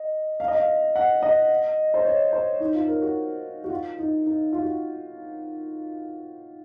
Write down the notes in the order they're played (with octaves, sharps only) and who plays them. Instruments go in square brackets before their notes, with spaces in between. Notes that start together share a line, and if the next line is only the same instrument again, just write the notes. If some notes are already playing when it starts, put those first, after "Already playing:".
Already playing: [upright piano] D#5
F5
D#5
F5
F#5
D#5
C5
C#5
C5
D#4
F4
A#4
F#4
F#4
F4
D#4
D#4
F4
F#4